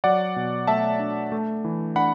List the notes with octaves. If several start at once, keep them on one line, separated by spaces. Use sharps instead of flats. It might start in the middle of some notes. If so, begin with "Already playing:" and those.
F#3 D5 F#5
B2
A3 E5 A5
D4
A3
E3
D4 F#5 B5